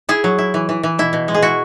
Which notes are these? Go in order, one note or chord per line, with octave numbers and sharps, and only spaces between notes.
E4 G#4
F#3
E4
E3
E3
E3
B2 E4
B2
G#3
G#4
E4 F#4